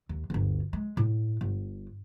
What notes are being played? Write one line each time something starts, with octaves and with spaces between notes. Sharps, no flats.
D#2
G1 D2
G#3
A2
G1